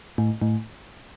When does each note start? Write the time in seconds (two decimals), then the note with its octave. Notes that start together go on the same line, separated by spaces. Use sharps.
0.18 A2
0.42 A2